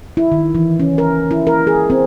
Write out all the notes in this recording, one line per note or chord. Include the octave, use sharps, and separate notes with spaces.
E4
D#3
E3
C#4
A#4
E4
A#4
G#4
C4